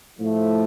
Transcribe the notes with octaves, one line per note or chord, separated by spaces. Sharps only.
A2 F3 A3